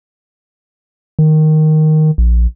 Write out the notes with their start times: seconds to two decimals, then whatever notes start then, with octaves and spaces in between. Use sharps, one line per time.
1.19 D#3
2.18 A#1